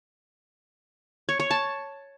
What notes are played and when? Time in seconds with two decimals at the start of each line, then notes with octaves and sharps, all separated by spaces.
1.29 C#5
1.40 C#5
1.51 A5